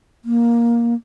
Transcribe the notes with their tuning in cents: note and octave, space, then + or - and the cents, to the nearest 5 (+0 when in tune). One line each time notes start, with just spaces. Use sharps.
A#3 +10